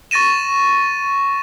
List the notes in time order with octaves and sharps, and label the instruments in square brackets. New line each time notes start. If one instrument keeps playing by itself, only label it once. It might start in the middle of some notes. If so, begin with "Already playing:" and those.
[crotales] C#6 A6 A#6 D#7 E7